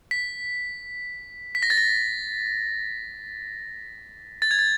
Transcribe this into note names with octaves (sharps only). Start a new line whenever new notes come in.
B6
B6
A#6
A6
A#6
A6
G#6
A6